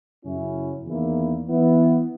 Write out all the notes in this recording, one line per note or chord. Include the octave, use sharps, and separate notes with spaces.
F#2 C#3 F#3 C#4 E4
E2 D#3 A#3 E4
E3 B3 E4